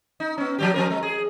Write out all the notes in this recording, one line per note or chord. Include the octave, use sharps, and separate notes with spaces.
D#4
B3 C#4
F3 F#3 G4
F3 C4 A#4
G#3
G#4